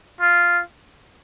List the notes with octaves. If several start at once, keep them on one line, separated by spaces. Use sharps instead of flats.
F4